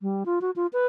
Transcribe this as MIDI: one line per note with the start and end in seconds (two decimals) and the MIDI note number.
0.01 0.23 55
0.26 0.39 65
0.41 0.51 66
0.56 0.67 65
0.73 0.87 71